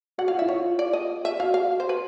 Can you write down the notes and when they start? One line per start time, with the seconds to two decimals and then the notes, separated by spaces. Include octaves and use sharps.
0.18 F#4 F#5
0.28 F5
0.31 F4
0.39 E5
0.42 E4
0.49 C#5
0.54 F4
0.79 D5
0.93 D#5
1.25 E5
1.40 F#4 F5
1.54 F5
1.80 C5
1.89 B4